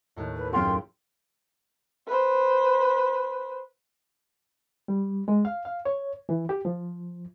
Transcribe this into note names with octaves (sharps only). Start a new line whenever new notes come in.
D#2 A2
B4
F#2 F4 G#4 G5
B4 C5
G3
G#3
F5
F5
C#5
E3
G4
F3